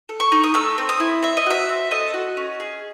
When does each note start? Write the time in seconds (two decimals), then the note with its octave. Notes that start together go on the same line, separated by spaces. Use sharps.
0.09 A4
0.20 C#6
0.32 D#4
0.44 D#6
0.54 A3 E6
0.78 C4
0.89 D#6
1.00 E4
1.23 C4 E5
1.37 D#5
1.46 F#4 E5
1.69 C4
1.91 A4 D#5
2.14 F#4
2.37 C#4
2.60 G#4